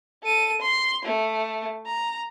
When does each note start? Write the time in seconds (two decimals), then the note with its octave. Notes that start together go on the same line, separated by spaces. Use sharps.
0.23 A4 D#7
0.62 C6
1.05 A3
1.86 A#5